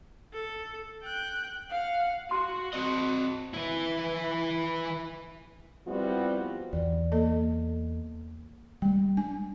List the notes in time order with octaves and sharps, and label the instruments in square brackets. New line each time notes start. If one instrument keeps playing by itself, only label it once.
[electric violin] A4
G5 F#6
[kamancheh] F5 [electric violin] F#5
[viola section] F#4 [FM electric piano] C6
[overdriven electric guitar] C4 D#5
[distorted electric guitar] E3 E4
[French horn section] F3 G3 B3 C4 E4 F#4
[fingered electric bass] E2 [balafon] D5
[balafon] A#3 A4 D#5
[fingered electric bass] G3 G#3 [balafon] G5
[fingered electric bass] D4 [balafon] G#5